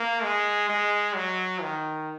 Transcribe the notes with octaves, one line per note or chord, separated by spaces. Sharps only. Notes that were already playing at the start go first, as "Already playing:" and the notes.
Already playing: A#3
G#3
G#3
F#3
D#3